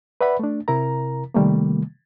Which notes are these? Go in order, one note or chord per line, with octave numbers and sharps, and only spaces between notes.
B4 D5 E5 F#5 B5
A3 D4
C3 E4 A#4 A#5
C3 D#3 G3 A3 A#3